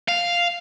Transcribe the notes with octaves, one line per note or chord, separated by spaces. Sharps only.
F5